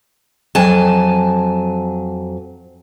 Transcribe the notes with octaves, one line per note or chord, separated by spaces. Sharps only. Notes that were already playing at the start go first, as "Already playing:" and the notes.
F2 F#3 G#5 A5